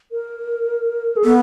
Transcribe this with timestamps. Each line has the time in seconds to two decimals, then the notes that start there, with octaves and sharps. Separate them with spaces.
0.12 A#4
1.17 G#4
1.24 B3 A4